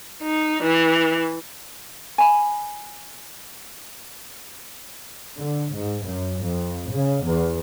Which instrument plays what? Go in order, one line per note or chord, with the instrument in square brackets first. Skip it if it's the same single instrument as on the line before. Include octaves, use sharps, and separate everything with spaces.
[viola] D#4
E3
[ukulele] G#5 B5
[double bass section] D3
G#2
F#2
F2
C#3
E2